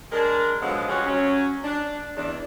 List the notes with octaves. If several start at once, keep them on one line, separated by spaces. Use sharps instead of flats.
G#3 D4 A#4
B2 D3 F3 F#3 G#3 B3
G3 G#3 C#4 F4 F#4 G#4
F#3 C#4
D4
E2 D4